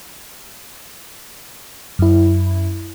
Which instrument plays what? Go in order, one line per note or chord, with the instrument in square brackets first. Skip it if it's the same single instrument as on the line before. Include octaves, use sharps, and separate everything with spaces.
[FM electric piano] F#2 E4